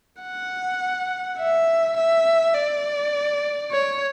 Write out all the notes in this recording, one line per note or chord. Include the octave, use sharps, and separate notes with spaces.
F#5
E5
E5
D5
C#5